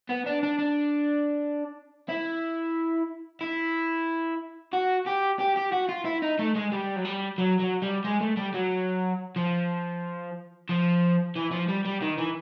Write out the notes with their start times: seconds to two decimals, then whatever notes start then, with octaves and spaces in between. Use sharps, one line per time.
0.09 B3
0.26 D4
0.43 D4
0.59 D4
2.09 E4
3.41 E4
4.73 F#4
5.06 G4
5.39 G4
5.56 G4
5.72 F#4
5.89 F4
6.05 E4
6.22 D#4
6.39 A3
6.55 G#3
6.72 G3
6.96 F#3
7.05 G3
7.38 F#3
7.60 F#3
7.82 G3
8.04 G#3
8.21 A3
8.37 G3
8.54 F#3
9.36 F3
10.69 F3
11.35 E3
11.51 F3
11.68 G3
11.85 G3
12.02 D#3
12.18 E3